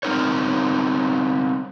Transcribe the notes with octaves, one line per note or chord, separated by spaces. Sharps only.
G3 C4 D#4 A#4 C#5